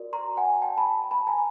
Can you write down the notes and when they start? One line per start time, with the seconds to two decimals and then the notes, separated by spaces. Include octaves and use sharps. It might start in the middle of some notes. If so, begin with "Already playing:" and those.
Already playing: F#4 A#4 D5
0.13 A#5 C6
0.37 F#5 G#5
0.62 G5 A5
0.77 A5 B5
1.11 A5 B5
1.27 G#5 A#5